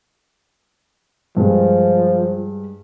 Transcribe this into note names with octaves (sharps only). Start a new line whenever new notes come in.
G2 F3 G#3